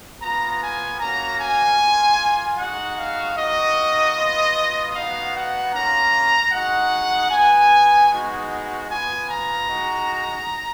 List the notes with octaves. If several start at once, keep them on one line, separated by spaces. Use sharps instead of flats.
B3 F4 A#5
G#5
A#3 C#4 F#4 A#5
G#5
A#3 F4
G#3 D#4 F#4 F#5
F5
A#3 D#4 F#4 D#5
B3 F4
B3 D#4 F#4 F5
F#5
A#3 C#4 F4 A#5
G#3 D#4 F#4 F#5
B3 F#4 G#5
G#3 B3 D#4 F#4
B3 F4 G#5
A#5
G#3 D#4 F#4